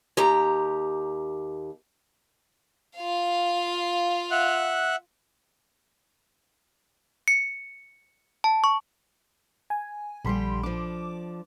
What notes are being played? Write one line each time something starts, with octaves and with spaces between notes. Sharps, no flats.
D#2 G4 A#5
F4 F5
E5 F#5 F#6
C#7
A5
C#6
G#5
A#1 D3 G3 G4 B5 C6
F3 D4 D6